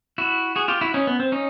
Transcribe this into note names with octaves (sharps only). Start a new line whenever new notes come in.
E4 F#4
F#4 G#4
F4 G4
E4 F#4
C#4 D#4
B3
C4
C#4 D#4